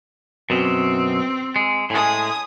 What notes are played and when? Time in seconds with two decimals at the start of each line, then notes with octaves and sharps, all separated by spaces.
0.50 F#2 B2 C4
1.56 G#3
1.90 A2 G#3 G#5 D#6